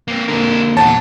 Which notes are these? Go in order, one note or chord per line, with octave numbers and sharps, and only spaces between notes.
A#3 C4
D3 A#3 C4 A#4
E2 A#2 C#5 F#5 A5